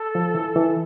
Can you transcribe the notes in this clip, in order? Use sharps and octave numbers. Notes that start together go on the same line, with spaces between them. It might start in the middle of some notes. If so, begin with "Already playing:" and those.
Already playing: A4
F3
E3
E3